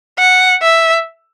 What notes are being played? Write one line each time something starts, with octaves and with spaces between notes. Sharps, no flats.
F#5
E5